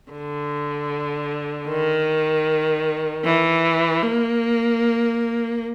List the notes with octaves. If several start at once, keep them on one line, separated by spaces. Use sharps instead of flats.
D3
D#3
E3
A#3